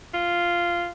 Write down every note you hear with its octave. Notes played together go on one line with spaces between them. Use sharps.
F4